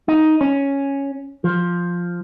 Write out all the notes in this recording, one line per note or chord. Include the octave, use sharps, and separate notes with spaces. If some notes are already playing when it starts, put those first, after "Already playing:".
D#4
C#4
F3